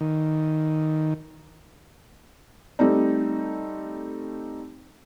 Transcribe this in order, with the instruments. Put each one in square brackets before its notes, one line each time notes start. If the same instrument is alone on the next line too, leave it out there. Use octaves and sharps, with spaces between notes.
[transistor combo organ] D#3
[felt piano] G3 A3 C4 D#4